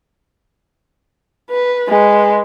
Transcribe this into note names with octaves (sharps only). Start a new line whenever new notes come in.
B4
G#3 B4